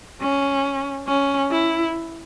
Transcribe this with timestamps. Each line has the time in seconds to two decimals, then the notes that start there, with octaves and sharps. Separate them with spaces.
0.21 C#4
1.08 C#4
1.51 E4